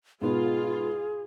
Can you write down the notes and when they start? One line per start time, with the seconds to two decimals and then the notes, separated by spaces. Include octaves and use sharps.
0.22 G#2 B2 B3 F4 G#4